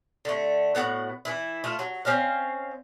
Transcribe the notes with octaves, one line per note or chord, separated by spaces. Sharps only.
D3 A3
A2 B3 F#4 F#5
E3 E4
A3 F4
F#3
C4 C#4 D#5 F5